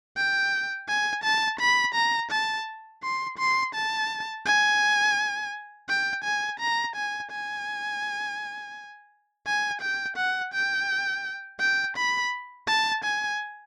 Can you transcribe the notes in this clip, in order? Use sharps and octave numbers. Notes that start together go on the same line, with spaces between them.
G5
G#5
A5
B5
A#5
A5
C6
C6
A5
G#5
G5
G#5
A#5
G#5
G#5
G#5
G5
F#5
G5
G5
B5
A5
G#5